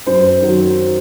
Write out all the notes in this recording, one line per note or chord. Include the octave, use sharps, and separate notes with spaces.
F#2 C5
D#3 F#3